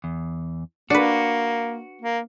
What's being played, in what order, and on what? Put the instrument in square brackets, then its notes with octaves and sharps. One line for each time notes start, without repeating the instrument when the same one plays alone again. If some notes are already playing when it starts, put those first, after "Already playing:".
[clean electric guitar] E2
[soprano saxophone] A#3 [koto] D4 B4 [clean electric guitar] F#4
[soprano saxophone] A#3